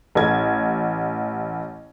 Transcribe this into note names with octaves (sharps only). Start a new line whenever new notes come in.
A1 G#6